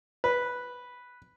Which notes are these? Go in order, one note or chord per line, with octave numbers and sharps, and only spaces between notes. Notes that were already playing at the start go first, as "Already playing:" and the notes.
B4